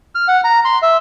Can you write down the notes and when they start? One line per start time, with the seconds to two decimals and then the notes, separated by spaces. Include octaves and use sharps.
0.15 F6
0.28 F#5
0.44 A#5
0.65 C6
0.82 E5